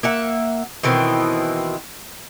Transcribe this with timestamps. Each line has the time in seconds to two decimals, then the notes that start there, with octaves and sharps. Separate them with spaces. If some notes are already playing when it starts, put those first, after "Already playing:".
0.03 A#3 E5 F#5
0.83 B2 D#3 E3 C4